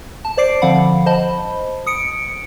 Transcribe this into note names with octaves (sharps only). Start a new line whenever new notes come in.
A5
C5 D5 D6 C7 D7
D3 F3 C4 F5 F#5 B5
C5 D#5 A5 B5
D#6 C#7 D7